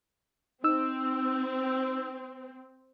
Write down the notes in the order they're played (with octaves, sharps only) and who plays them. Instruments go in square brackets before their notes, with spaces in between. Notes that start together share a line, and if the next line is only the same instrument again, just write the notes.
[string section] C4 [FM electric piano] D#4 E6